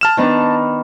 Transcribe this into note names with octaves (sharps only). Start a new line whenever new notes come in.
A5 F6 E7
D#3 B3 D4